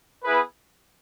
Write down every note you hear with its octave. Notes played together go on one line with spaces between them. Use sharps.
B3 E4 G#4 B4